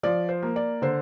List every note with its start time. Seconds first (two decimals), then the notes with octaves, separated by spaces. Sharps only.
0.03 F3 D5
0.29 C5
0.43 A#3
0.56 D5
0.82 D3 C5